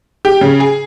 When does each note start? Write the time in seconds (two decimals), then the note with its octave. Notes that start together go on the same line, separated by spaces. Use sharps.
0.25 G4
0.41 C#3
0.60 G#4